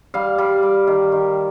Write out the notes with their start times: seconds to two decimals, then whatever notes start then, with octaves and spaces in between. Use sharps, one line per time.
0.14 G3 F5
0.38 G3
0.63 G3
0.87 D#3
1.12 D#3